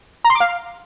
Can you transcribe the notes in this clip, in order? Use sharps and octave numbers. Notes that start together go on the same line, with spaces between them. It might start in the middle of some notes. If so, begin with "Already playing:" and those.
A#5
C6
D6
F5